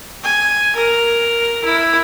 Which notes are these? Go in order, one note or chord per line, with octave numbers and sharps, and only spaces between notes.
G#5
A#4
E4